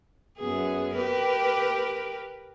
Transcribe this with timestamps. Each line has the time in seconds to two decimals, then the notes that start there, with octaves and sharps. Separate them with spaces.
0.39 F#2 B3 G#4
0.94 G4 A#4 B4